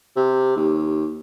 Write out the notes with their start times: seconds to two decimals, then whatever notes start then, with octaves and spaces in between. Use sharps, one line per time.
0.16 C3
0.56 D#2